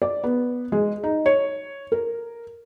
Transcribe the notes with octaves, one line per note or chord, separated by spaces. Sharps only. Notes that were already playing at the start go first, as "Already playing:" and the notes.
D5
B3
G#3
D#4
C#5
A#4